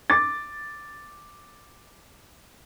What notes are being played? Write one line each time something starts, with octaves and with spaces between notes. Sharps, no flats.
D6 A6